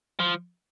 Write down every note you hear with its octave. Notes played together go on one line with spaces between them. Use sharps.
F3